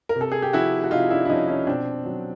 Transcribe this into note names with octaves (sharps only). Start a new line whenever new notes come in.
A#4
C3
A4
G#4
G4
F3 E4 F#4
F#4
C3 D#4 F4
D4 E4
E4
F3 C#4 D#4
C#4 D#4
B2 C4 D4
F#3